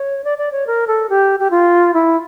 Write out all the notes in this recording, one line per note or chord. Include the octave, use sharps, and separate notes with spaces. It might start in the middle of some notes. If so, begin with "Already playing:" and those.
Already playing: C#5
D5
D5
C#5
A#4
A4
G4
G4
F4
E4